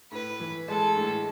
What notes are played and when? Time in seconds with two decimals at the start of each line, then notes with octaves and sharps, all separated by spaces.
0.12 A2 B4
0.40 E3
0.68 G#3 A4
0.96 A2